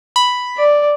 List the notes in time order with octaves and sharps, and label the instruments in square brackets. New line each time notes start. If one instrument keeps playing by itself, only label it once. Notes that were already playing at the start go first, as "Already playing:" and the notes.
[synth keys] B5
[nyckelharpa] D5